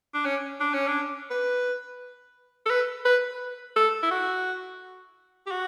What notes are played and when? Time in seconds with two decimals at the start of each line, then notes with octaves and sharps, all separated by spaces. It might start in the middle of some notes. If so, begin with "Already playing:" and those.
0.14 D4
0.25 C#4
0.60 D4
0.74 C#4
0.88 D4
1.31 B4
2.66 A4
2.70 B4
3.05 B4
3.76 A4
4.03 E4
4.11 F#4
5.47 G4
5.51 F#4